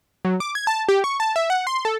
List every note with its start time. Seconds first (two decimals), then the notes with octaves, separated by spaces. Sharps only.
0.25 F#3
0.40 D6
0.55 G#6
0.67 A5
0.89 G4
1.04 C#6
1.20 A5
1.36 E5
1.50 F#5
1.67 C6
1.85 A4